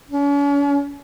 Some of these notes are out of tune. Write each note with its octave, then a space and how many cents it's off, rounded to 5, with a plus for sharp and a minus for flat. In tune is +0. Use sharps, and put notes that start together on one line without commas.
C#4 +45